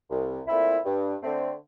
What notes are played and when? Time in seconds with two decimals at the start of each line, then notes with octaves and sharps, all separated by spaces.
0.10 C2
0.47 A#2 A3 C4 E4
0.84 G2
1.22 D3 A3 C4